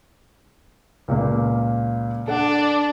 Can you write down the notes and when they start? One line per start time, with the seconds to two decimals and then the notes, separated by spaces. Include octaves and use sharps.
1.08 C#2 A#2 A#3
2.28 D4 A4 F#5